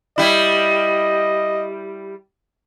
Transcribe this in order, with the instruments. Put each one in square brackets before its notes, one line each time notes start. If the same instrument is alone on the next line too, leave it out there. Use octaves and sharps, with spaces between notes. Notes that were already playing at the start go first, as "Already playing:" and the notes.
[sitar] G3 E4 [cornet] D#5